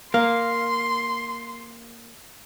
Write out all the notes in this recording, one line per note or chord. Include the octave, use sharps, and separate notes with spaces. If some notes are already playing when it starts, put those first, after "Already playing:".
A#3 F5 C6